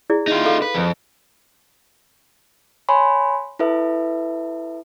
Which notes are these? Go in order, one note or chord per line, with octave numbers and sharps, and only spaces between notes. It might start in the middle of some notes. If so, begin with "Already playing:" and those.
E4 G#4 D5
D#4 F4
A4 F5
B4
F2
C#5 G#5 B5 C6
E4 A4 B4 E5